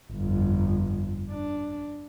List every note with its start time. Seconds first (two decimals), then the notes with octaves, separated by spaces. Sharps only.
0.12 G1 F2
1.30 D4